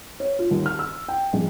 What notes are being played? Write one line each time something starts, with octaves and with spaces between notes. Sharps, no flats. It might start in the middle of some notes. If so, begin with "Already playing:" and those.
C#5
F4
D#2
F6
E6
G5
A#1